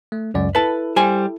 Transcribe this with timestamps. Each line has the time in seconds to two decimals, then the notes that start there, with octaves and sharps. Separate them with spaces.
0.12 A3
0.34 C#2 F#2 D5
0.55 E4 A4 B4 A5
0.96 G3 C5 G#5